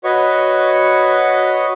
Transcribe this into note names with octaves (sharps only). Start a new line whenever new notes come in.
F#4 B4 C#5 D#5 C#6